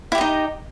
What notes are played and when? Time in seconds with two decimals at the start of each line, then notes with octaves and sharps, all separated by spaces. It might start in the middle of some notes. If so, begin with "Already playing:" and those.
0.12 E4
0.15 G4
0.18 D#5
0.21 D#4